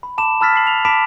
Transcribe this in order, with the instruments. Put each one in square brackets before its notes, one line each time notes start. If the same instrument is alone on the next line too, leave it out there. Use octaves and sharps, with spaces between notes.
[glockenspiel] B5
A5 B5 D6 E7
A5 B5 E6 F6 A6 B6
A5 F6 C7 F#7
F7
A5 B5 D6 B6 D7 E7